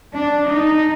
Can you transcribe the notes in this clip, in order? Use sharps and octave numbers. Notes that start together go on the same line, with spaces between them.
D4
D#4